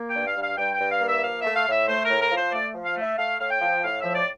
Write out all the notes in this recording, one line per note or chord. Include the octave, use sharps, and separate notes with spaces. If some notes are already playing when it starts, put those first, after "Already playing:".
Already playing: A#3
G5
G2
F5
G2
F5
G2 G5
G5
G2
F5
A#3
E5
F3 F5
A3 E5
F5
A2 E5
A3 C5
A#4
A2
A#4
F3
C5
A3 D5
F3
F5
A3
E5
A3 F5
A2 F5
G5
F3
A2 F5
E5
F3
D5